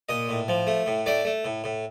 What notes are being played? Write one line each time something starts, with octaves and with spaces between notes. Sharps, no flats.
A#2 D#5
A2
F3
A3
A2
A3 D5
A3
A2
A2